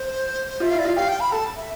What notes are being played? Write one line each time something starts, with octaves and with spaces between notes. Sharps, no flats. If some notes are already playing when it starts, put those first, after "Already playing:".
Already playing: C5
F4 E5
E4 F5
D5
F4 F5
G4 F5
G5
B5
A4 A5
E5